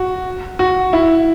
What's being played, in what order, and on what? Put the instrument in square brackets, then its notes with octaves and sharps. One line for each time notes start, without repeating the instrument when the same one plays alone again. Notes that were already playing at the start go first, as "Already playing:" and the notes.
Already playing: [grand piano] F#4
F#4
E4